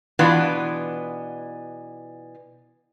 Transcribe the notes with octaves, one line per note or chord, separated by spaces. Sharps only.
B2 E3 B3 D4 F4